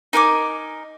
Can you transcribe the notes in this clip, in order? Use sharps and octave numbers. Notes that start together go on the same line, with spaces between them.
D#4 A#4 G#5 D6